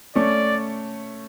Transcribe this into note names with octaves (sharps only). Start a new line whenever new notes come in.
A3 C#4 D5